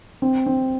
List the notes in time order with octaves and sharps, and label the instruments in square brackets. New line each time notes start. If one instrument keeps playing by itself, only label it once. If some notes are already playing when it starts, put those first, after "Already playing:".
[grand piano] C4
C4